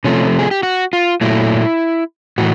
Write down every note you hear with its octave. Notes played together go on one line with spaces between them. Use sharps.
C3 F3 A3 C#4
G#4
G4
F#4
F4
A#2 F#3 A3 E4
A2 E3 F#4